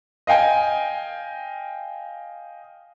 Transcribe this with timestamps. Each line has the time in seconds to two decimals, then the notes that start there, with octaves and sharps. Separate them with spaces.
0.27 D#5 F5 G5 G#5